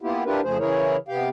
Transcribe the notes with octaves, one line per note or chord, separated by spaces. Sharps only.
A#3 B3 E4 F4 G4
D4 E4 F4 G4 A#4 B4
F2 C#3 F3 A3 G#4 C5
C#3 E3 E4 G#4 A#4 C#5
C3 B3 G4 F5 G5